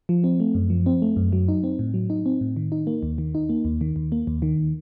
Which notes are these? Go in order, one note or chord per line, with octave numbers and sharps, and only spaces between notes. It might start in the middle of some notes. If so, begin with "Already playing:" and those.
F3
C4
A3
F#2
F3
C4
A3
F#2
F#3
D#4
C4
A2
F#3
D#4
C4
A2
D#3
D#4
A#3
D#2
D#3
D#4
A#3
D#2
D#3
D#2
A#3
D#2
D#3